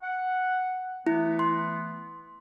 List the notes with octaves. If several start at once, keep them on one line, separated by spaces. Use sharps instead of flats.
F#5
E3 A3 B3 E4
C6